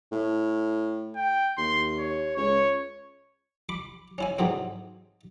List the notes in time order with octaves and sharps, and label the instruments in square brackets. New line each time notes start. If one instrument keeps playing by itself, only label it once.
[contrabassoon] A2
[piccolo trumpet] G5
[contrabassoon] D#2 [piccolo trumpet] C6
[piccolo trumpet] C#5
[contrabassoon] C#2 [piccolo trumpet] C#5
[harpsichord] B5 D6
C#4 E4 G#5
G#2 D3 E3 F#3 B3 C4